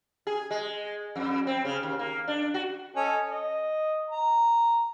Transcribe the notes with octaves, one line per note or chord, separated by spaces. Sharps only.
G#4
G#3
F2
C4
C#3
D#2
A#3
D4
F#4
C#4 A4 D#5
D#5
A#5